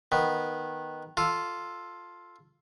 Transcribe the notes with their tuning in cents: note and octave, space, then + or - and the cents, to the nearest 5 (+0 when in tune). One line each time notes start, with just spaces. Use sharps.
D#3 +0 B3 -10
F4 +5 A4 +0